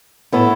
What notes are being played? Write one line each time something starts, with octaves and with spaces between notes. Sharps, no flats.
A2 E3 B3 E4 A4